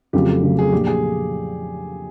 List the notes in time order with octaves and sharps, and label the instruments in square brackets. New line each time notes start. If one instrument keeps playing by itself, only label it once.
[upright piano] F2 C#3 F#3 A3 [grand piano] G4
[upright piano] F2 C#3 F#3 A3
[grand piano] G#4
[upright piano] A#2 F3 A3 D4 [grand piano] G4
[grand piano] G#4